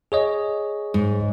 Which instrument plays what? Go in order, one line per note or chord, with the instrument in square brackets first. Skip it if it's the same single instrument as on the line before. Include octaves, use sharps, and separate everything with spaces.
[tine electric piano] G#4 C#5 D#5
[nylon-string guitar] G#2